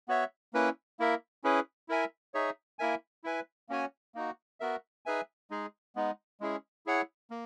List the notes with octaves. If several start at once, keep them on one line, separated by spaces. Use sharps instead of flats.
B3 F#4 C#5 E5
A#3 C#4 E4 B4
A#3 E4 A#4 E5
C#4 E4 G#4 B4
E4 A#4 E5 G#5
D#4 G#4 C#5 E5
A#3 E4 A#4 E5 G#5
E4 B4 E5 G#5
A#3 C#4 F#4 C#5 G#5
A#3 D#4 F#4
B3 F#4 A#4 E5
D#4 G#4 B4 E5 G#5
G#3 D#4 G#4
G#3 B3 D#4
G#3 C#4 E4 G#4
E4 G#4 C#5 F#5
A#3